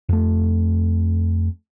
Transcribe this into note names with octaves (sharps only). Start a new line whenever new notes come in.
F2 A3